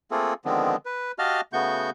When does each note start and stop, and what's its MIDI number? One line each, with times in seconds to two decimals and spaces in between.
0.11 0.34 57
0.11 0.34 58
0.11 0.34 60
0.11 0.34 65
0.11 0.34 68
0.11 0.34 69
0.45 0.76 50
0.45 0.76 51
0.45 0.76 53
0.45 0.76 56
0.45 0.76 59
0.45 0.76 60
0.86 1.12 71
1.19 1.41 66
1.19 1.41 67
1.19 1.41 75
1.19 1.41 77
1.19 1.41 81
1.19 1.41 89
1.53 1.90 49
1.53 1.90 57
1.53 1.90 59
1.53 1.90 66
1.53 1.90 85
1.53 1.90 91